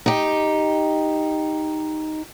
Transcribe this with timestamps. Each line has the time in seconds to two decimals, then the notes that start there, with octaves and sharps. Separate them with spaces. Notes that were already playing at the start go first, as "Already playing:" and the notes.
0.06 D#4 G4